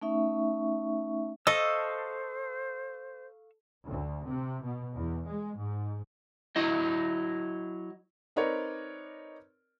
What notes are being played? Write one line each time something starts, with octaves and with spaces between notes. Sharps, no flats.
A3 C#4 D#4 E5 C#6
A4 C5 D#5 F5 C#6 E6
D2
C3
B2
E2
G#3
G#2
F#3 E4 D#5
C4 D#4 A#4 B4 C#5 D5